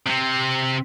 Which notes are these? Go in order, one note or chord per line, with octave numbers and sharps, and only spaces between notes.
C3 C4